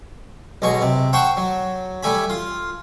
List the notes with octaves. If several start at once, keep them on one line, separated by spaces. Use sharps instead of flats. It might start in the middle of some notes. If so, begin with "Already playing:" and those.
B1 B2 G#3 C#6
C3
C5 F#5 G5 A5 C#6
F#3
G3 A3 G#5 B5
F4